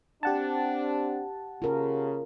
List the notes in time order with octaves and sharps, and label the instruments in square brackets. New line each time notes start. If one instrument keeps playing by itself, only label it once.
[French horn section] C4 D4 [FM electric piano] G4 F#5 A5
[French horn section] C#3 [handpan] F4 A#4